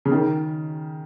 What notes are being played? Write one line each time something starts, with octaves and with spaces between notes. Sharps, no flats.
C#3
D#3